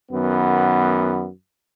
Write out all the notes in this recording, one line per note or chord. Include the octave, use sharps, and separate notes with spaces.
F#2 D#3 B3